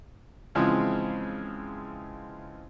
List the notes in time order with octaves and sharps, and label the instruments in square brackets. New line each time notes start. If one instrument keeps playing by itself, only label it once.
[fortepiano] C#3 E3 F3 G#3 C4